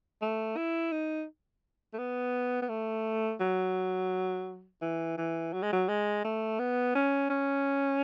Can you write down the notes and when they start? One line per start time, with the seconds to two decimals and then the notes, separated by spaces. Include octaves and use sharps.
0.22 A3
0.57 E4
0.92 D#4
1.93 A3
1.98 B3
2.62 B3
2.69 A3
3.40 F#3
4.82 E3
5.18 E3
5.53 F#3
5.63 G#3
5.73 F#3
5.88 G#3
6.24 A3
6.59 B3
6.95 C#4
7.30 C#4